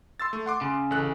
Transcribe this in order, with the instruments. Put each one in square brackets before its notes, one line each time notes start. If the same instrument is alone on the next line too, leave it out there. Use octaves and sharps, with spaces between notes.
[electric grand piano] C6 E6 A6
A3
F#5 C6 D6
[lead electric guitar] C#3
[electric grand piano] A1 A4 F#6